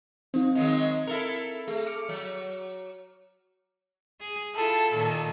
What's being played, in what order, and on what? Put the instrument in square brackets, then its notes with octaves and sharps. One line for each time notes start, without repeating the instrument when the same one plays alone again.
[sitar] F3 [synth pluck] C4 D#4
[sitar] D#3 F#3 G#3
E4 A4 A#4
[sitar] A3 [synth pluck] G#4 A4
[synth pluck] D6 F6 C#7
[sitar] F#3
[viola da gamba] G#4
[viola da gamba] E4 F4 [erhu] A4
[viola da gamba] A#2 D#3